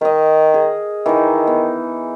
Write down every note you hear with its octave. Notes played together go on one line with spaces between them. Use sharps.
D#3 A#4 D#5
G#4
D#3 E3 D#4
B3